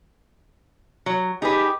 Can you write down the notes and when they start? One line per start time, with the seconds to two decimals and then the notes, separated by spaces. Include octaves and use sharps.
1.06 F#3
1.42 D#4 G4 G#4 B4